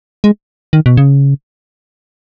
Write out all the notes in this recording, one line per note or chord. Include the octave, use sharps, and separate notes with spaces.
G#3
D#3
B2
C#3